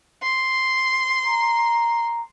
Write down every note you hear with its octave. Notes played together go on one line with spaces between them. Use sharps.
C6
A#5